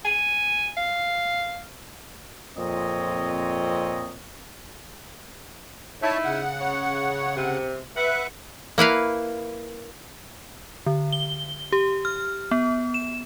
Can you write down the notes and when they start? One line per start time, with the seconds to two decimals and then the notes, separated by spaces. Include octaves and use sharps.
0.05 G#5
0.77 F5
2.56 F2 A#2 C4 C#5 D#5
6.02 D#4 E4 C#5 E5 A5
6.24 C#3 F#5
6.60 C#5
7.36 C3
7.97 B4 E5 F#5
8.78 A#3 E4 B4 F5
10.86 D3
11.13 G7
11.72 G4
12.05 F6
12.51 B3
12.94 E7